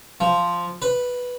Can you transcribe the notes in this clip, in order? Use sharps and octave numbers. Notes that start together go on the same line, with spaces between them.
F3
B4